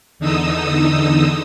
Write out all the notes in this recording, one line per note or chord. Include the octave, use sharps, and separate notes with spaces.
E2 D3 D#4 D#6 E6